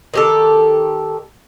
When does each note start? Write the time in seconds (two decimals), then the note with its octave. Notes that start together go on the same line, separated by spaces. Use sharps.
0.14 D#3 G4 A4